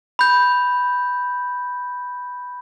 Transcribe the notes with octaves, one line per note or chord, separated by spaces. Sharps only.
B5 G6